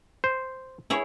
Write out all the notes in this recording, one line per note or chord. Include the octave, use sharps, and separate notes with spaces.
C5
E4 G#4 C#5